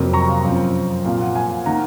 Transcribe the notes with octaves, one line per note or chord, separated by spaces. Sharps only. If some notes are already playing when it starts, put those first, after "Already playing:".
Already playing: F2 C3 F#3 A#3
A#5 C#6
F5
F#2 F3 C4
A#2 F3 C4 F5
F#5
F5 G#5
D#3 A#3 F#5 A#5